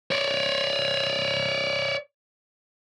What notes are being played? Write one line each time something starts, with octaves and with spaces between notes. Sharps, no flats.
C#5 D5